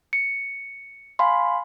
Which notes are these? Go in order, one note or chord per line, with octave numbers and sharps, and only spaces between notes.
C#7
F5 G#5 B5 C6